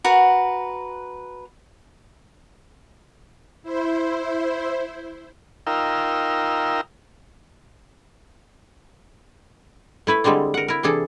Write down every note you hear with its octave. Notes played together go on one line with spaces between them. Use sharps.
F#4 A#4 B4 F#5
E4 C5
D#4 F4 A#4 G5 E6
A3 E4 B4
D3 G3 G#3 C4 D4
A#4 F#5
E4 A#4
C3 E3 D4 G#4 A4